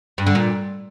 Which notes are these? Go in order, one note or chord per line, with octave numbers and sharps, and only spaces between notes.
G2
D3
A#2